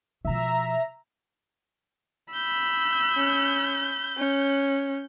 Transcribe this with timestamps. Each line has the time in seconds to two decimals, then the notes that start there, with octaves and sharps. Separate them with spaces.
0.25 B2 F3 E5 A#5
2.34 B5 E6 G6
3.17 C#4
4.17 C#4